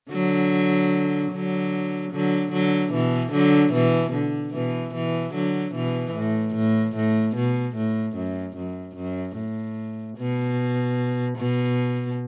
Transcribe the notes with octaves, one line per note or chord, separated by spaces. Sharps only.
D3 F#3
D3 F#3
D3 F#3
D3 F#3
B2 E3
D3 F#3
B2 E3
D3
B2 E3
B2 E3
D3 F#3
B2 E3
A2
A2
A2
B2
A2
F#2
F#2
F#2
A2
B2
B2